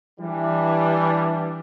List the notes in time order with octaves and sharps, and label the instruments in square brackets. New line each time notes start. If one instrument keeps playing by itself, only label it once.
[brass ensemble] E3 G3 D4